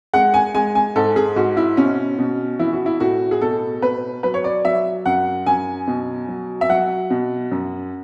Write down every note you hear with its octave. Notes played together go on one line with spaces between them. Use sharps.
G#3 F#5
G#5
G#3 G#5
G#5
G#2 A4
G#4
G#2 F#4
E4
B2 C#4
B2
E3 E4
F#4
E4
A2 F#4
G#4
B2 A4
B2 B4
F#3 B4
C#5
D5
F#3 E5
F#2 F#5
F#2 G#5
B2
F#3
E5
F#3 F#5
B2
F#2